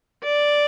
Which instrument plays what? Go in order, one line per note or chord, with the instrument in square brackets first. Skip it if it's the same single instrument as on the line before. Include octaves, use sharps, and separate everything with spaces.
[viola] D5